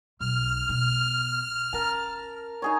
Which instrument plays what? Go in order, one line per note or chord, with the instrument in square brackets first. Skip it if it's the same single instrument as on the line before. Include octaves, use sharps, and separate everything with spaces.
[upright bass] B1 [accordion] F6
[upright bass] B2
[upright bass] C#4 [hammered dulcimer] A#4 A5
[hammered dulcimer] D#4 G#4 C#5